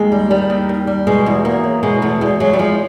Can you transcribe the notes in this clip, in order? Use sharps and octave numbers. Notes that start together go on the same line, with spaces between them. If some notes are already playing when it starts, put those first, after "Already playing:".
Already playing: D#2 G#3
G3
D#3 G3
D#2
D#2
G3
B2 G#3
E2
E2 A#3
F#3
B2 G#3
E2 A3
E2 G#3
F#3 G#3
G3
F3 G#3